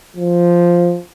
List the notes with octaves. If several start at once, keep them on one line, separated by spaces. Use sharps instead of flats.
F3